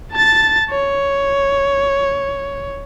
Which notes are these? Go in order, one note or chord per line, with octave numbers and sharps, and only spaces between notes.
A5 A6
C#5